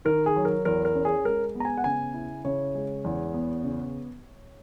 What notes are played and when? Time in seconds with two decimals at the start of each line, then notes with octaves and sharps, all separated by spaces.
0.05 D#3 A#4
0.26 G#4
0.36 F#3
0.45 A#4
0.65 E2 A#4
0.85 A#4
0.95 C#4
1.05 G#4
1.25 G#3 A#4
1.55 B3
1.60 A#5
1.65 G#5
1.77 F#5
1.84 C#3 G#5
2.14 E4
2.45 C#3 C#5
2.75 G#3
3.04 E2
3.34 B3
3.64 C#3